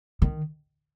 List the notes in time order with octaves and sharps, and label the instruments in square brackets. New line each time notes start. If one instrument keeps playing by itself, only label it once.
[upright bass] D#3